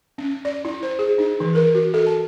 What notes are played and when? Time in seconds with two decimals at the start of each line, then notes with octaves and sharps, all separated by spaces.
0.18 C#4
0.45 D5
0.65 E4
0.83 C5
0.99 G#4
1.18 D#4
1.40 E3
1.55 A#4
1.74 F#4
1.94 A4
2.07 A5